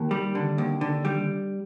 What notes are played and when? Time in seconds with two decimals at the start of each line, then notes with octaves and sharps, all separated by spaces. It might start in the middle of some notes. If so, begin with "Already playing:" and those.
Already playing: D#2
0.11 G3
0.35 D3
0.58 D#2
0.81 D3
1.05 G3